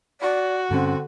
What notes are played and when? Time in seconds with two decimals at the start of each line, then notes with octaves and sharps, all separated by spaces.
0.21 F#4 D5
0.71 G2 D3 C4 C#4